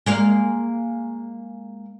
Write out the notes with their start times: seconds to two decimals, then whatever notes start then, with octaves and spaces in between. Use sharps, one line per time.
0.06 G#3 A#3 F5